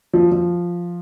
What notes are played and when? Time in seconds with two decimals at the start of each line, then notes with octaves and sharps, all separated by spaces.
0.13 F3
0.32 F3